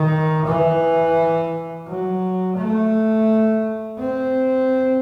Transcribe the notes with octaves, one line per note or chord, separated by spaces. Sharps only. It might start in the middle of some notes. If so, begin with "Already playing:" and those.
Already playing: D#3
E3
F#3
A3
C4